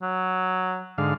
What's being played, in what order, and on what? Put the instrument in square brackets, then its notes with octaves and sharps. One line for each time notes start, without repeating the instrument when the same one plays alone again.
[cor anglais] F#3
[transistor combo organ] G#2 D3 F5